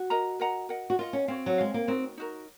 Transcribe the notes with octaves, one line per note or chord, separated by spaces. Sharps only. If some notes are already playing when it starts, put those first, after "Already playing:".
Already playing: F#4
A#4 D#5 F#5 A#5
A#4 D#5 F#5 A#5
A#4 D#5 F#5
F#4
F4 A#4 D#5 F#5
C#4
C4 F#4 C#5 F5
F#3
G#3 F#4 C#5 F5
A#3
C4 D#4 F#4 A#4
D#4 F#4 A#4